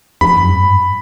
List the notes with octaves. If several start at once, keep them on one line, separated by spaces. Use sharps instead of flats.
F2 B5
F#2
G2
G#2